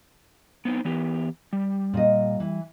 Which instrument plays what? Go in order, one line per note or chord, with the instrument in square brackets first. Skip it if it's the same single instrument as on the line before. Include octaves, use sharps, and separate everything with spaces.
[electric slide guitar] B3 C4 D#4
E3 B3 G4
G3
[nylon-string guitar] A#2 D#5
E3